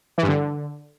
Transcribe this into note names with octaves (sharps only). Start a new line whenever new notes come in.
E3
G2
D3